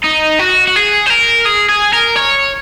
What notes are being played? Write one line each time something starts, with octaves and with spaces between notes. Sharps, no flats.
D#4
F#4
F#4
G#4
C5
A#4
G#4
G#4
A#4
C#5